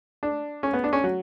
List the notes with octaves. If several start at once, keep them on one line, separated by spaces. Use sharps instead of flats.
D4
C#4
B3
D4
C#4
F#3